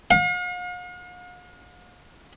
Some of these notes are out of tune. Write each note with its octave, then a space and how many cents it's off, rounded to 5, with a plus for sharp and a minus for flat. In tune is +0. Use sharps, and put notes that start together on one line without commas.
F5 +45